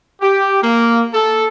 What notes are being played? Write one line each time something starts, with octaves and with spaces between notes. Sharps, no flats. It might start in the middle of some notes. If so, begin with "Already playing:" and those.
G4
A#3
A4